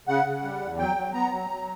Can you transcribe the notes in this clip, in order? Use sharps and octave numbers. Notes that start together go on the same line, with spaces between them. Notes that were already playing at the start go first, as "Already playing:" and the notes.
C#3 F#5
C#3
G3
E2
F#3 G5
F#3
B3 A#5
F#3
F#3